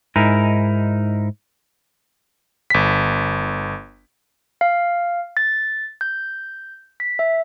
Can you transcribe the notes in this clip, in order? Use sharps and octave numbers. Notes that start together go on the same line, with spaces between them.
G#2 D#4 E4 A#4 G#5
G1 B6
F5
A6
G6
B6
E5